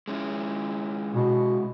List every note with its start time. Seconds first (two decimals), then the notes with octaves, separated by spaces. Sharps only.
0.08 G#3 C#4 E4
1.15 B2